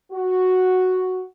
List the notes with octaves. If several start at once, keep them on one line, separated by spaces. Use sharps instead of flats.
F#4